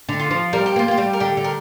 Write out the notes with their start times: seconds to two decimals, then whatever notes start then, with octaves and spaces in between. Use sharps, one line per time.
0.09 D3
0.19 F4
0.31 F3
0.53 G3 A#4
0.66 G4
0.76 A#3 F4
0.88 A#3 G4
0.98 G3
1.13 A#4
1.20 D3 G4
1.37 D3
1.44 A#4